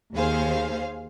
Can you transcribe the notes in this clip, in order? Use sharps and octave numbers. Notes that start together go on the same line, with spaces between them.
D#2 G#4 C5 F5